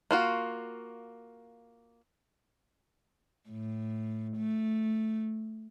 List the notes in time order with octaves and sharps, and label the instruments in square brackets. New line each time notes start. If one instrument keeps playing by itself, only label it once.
[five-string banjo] A#3 F4 F#4
[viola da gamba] A2
A3